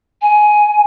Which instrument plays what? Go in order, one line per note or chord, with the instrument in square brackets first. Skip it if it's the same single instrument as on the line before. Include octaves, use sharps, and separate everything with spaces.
[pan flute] G#5